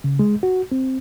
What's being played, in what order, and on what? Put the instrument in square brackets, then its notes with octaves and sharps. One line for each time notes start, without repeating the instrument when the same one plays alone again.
[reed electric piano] C#3
G#3
F#4
C4